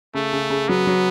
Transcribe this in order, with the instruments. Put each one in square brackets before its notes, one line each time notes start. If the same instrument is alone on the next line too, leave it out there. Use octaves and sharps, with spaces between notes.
[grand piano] C#3 [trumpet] A3
[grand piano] C#3
C#3
[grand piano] F#3 [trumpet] B3
[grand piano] F#3